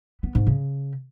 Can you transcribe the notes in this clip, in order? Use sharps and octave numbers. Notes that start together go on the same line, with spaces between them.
B3
G#2
C#3